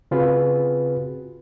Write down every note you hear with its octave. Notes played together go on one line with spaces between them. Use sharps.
C#3 C4 F4 F#4 G#4 B4